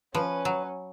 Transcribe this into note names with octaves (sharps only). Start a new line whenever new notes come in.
F3 C#4 B4
F#3